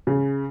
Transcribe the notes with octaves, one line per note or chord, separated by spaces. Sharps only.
C#3